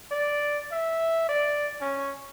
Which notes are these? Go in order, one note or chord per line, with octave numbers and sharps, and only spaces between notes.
D5
E5
D5
C#4